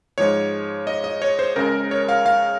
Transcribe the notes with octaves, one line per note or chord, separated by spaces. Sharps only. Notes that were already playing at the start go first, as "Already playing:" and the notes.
G#2 F3 G#3 C#5
D#5
D#5
C#5
C5
C#2 C#3 G#3 A#4
C#5
F5
F5